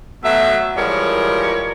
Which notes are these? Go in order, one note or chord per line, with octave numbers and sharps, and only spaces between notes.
B2 F#3 A3 E5
E3 F3 G3 G#3 A#4 C#5